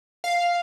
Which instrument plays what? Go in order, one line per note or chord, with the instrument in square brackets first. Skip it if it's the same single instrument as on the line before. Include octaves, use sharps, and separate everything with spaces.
[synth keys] F5